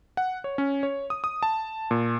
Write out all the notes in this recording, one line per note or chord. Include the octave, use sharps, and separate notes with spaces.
F#5
C#5
C#4
C#5
D#6
D#6
A5
A#2